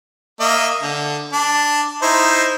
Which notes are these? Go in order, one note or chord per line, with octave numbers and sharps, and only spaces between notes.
A#3 D#5 E5
D3
D4
D#4 E4 C5